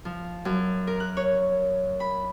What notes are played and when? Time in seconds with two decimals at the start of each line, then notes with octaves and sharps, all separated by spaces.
0.05 F3
0.45 F#2
0.87 A#4
1.00 F#6
1.17 C#5
2.00 B5